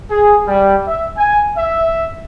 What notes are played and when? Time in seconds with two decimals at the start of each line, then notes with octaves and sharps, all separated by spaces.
0.11 G#4
0.46 G3
0.86 E5
1.17 G#5
1.57 E5